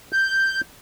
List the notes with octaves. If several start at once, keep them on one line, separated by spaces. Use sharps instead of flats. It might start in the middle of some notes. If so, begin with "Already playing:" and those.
G6